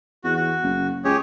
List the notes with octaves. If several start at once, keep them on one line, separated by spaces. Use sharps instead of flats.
E2 F#4
F#4
F#1
C#2 G4 G#4 C#5